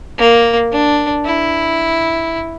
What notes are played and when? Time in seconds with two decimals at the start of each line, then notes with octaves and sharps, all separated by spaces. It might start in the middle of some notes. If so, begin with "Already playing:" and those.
0.18 A#3
0.72 D4
1.25 E4